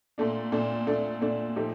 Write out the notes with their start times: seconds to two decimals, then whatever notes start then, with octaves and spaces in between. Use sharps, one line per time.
0.18 A#2 A3 D4
0.52 A#2 A3 D4
0.87 A#2 A3 D4
1.21 A#2 A3 D4
1.56 A#2 F3 A3 D#4 G4